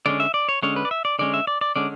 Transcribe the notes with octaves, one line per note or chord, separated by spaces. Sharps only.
D3 G#3 C#4 D5
E5
D5
C#5
D3 G#3 C#4 C#5
B4
D5
E5
D5
D3 G#3 C#4 D5
E5
D5
D5
D3 G#3 C#4 D5